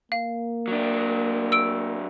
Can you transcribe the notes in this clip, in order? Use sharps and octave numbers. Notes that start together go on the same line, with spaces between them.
A#3 F5
F#3 D4
E6 D7